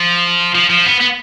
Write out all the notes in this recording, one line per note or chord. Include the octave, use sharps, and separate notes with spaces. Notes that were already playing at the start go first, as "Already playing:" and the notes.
Already playing: F3
F3
F3
B3
B3